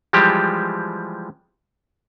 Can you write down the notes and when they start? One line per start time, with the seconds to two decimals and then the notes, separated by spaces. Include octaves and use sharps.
0.13 E3 F3 G3 G#3 G4